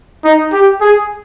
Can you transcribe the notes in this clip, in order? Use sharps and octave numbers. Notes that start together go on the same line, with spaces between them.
D#4
G4
G#4